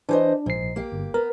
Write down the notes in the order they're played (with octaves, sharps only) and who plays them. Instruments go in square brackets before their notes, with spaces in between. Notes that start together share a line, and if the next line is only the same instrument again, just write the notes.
[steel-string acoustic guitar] E3 C5 D#5 [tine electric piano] D4
[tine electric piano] A#1 C7 [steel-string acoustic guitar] G#2
[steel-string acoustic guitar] A#3 G4
[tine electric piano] G1
[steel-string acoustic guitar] B3 [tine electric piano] A#4